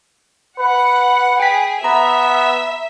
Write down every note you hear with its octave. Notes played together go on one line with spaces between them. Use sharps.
B4 F#5
G#4 G5 B6
B3 E5 A#5